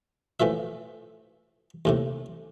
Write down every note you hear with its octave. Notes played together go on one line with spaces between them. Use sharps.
A2 E3 F3 E5
D#2 A2 C3